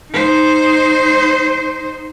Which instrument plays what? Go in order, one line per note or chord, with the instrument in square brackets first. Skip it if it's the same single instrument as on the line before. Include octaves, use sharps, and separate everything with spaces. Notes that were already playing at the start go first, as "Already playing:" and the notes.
[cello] D#4 C5